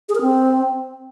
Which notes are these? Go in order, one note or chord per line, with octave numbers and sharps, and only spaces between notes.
G#4
A#4
C4